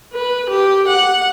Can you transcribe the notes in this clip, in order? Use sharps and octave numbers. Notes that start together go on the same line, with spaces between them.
B4
G4
F#5